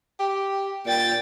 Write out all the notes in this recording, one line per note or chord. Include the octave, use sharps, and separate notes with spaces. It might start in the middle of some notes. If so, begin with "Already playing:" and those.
G4
A#2 G5 A6